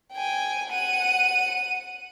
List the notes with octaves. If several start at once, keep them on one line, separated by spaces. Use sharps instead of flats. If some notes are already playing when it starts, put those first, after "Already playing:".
G5 G#5
F#5 D#7